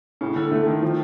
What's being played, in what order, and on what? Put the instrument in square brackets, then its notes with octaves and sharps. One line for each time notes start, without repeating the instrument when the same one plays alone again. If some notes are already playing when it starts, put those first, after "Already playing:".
[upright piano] A2 [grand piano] C#3
[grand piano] D3
[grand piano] D3 [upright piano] A3
[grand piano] D#3
[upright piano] D#3 [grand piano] F3